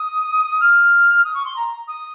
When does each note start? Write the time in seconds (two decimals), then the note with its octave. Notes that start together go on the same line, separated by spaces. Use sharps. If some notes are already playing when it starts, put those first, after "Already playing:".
Already playing: D#6
0.60 F6
1.25 D#6
1.34 C#6
1.45 C6
1.56 A#5
1.88 D#6